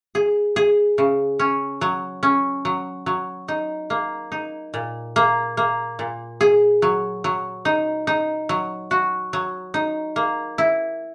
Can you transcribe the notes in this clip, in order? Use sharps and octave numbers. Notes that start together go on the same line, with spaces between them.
G#4
G#4
C#3
C#4
F#3
C#4
F#3
F#3
D#4
A#3
D#4
A#2
A#3
A#3
A#2
G#4
F#3
F#3
D#4
D#4
F#3
F#4
F#3
D#4
A#3
E4